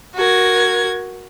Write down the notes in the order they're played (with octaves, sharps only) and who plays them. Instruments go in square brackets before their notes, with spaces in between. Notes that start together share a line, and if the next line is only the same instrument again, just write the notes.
[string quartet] F#4 A#4 G#6